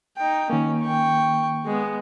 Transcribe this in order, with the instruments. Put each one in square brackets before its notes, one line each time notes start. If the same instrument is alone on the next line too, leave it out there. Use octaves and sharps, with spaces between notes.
[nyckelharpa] D#4 G5
[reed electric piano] D#3 A#3 [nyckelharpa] C#4
[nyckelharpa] G5 C#6
G#3 B3